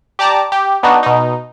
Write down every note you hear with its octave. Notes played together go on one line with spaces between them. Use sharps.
G4 D5 A5 A#5 D6
G4
B3 D4 D#4 F#4
B2 D#4